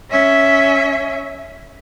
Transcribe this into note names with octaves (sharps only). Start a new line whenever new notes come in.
C#4 E5